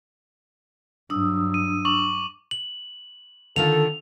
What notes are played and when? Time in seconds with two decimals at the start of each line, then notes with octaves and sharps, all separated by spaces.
1.10 G2 F#3 D4 D#6 E6
1.54 D#7
1.85 C#6 D6 F#7
2.51 F#7
3.56 D3 D#3 F4 A4 F7